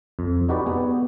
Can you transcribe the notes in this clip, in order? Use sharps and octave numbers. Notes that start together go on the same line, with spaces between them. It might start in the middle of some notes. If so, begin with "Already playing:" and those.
F2
D#4 F#4 G4 B4 D5
B3 G#4